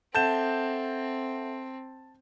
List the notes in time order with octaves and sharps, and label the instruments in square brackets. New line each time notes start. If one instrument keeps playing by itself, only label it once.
[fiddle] C4 [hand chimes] A4 E5 F#5 [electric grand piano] A5 G6 E7